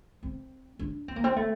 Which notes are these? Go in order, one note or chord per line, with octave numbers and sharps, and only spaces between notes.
C4
D4
C4
A#3
C4
A3